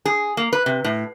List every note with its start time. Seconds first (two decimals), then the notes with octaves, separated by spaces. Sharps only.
0.05 G#4
0.37 A#3
0.53 B4
0.66 C3
0.84 A2